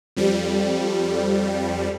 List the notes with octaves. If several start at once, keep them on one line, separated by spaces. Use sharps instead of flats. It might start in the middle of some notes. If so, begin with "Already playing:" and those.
F2 G3